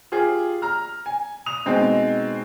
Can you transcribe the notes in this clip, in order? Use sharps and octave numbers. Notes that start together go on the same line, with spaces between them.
F4 G4 G#4
A#5 F6
G#5
D#6 F7
B2 G#3 C4 D#4